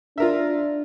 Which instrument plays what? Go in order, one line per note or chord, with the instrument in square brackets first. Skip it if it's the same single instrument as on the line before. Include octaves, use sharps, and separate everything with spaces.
[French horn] D4 [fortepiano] F4 A#4 E5